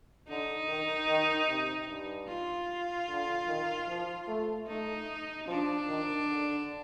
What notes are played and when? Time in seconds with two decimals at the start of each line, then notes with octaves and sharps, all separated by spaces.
0.29 D3 D#4
0.68 D#3
1.09 D#3
1.49 C3
1.88 G2
2.28 F4
3.09 D3
3.48 D#3
3.89 F3
4.28 A3
4.68 A3 D#4
5.48 F3 D4
5.88 D#3
6.28 D3